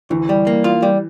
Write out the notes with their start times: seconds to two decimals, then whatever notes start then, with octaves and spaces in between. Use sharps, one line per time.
0.10 D2 E3
0.29 G3
0.47 A#3
0.64 F4
0.82 G3